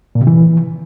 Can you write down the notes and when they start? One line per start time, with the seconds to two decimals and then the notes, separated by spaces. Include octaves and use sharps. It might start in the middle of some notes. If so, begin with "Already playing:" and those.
0.15 A#2
0.21 C3
0.27 E3